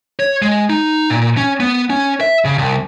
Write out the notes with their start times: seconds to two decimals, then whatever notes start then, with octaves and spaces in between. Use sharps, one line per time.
0.20 C#5
0.42 G#3
0.70 D#4
1.10 A#2
1.37 C#4
1.60 B3
1.90 C#4
2.21 E5
2.45 C#3
2.58 C2